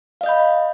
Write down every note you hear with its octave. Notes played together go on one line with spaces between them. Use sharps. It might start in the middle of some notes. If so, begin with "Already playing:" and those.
D#5 F5 B5 G6